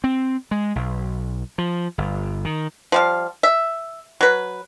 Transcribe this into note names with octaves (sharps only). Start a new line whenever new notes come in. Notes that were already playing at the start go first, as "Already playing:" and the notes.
C4
G#3
B1
F3
G1
D#3
F3 G3 F5
E5
F#3 B4